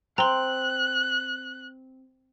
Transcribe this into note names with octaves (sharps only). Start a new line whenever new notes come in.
C4 A#5 C6 F#6